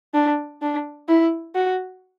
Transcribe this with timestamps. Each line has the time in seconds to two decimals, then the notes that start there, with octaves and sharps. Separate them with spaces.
0.14 D4
0.62 D4
1.08 E4
1.55 F#4